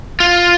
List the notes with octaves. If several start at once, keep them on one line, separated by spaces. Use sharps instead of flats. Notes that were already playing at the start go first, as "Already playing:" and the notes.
F4